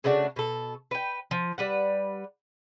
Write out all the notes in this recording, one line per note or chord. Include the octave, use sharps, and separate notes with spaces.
C#3 A3 D4 F#4
B2 A4
B4 G5
F3
G3 B4 F#5